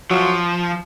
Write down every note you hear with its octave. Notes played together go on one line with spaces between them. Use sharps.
F3 F#3